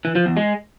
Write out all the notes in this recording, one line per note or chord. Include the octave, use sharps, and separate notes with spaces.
E3
F3
E2
G#3